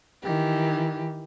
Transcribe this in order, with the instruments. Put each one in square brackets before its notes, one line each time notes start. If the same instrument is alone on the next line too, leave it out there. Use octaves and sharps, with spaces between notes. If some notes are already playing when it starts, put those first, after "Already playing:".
[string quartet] D#3 E3 G4